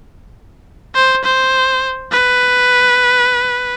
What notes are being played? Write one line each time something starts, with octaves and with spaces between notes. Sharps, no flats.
C5
C5
B4